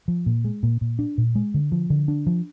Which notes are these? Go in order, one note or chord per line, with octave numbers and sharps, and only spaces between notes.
F3
A#2
G#3
A#2
A#2
D4
A#2
G#3
D3
F3
D3
D4
F3